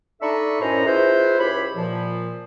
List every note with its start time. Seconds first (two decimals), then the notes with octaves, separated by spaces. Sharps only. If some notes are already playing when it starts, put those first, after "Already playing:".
0.21 D4 D#4 A4 E5 B5 C#6
0.62 F#2 A2 C#4 C5 D#5 A#5
0.86 E4 F4 G#4 B4 C5
1.39 C#2 G4 C#5 B5
1.76 A#2 F3